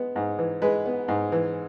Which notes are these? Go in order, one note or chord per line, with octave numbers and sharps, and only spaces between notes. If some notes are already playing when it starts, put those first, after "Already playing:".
Already playing: G#3 B3
G#2
E3
G#3 B4
B3
G#2
E3